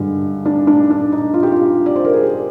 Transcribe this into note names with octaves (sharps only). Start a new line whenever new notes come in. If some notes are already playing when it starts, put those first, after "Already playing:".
Already playing: G2 D3 G#3
D4
D4
D4
D#4
F4
G4
F4
D5
C5
A#4
G#4
G4